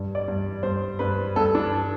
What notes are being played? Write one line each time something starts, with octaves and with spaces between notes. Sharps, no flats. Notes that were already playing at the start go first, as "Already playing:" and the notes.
Already playing: G2
D5
G2
G2 C5
G2 B4
G2 A4
D4